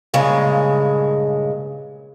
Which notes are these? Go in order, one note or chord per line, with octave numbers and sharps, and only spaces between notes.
G2 A#2 C#3 G#3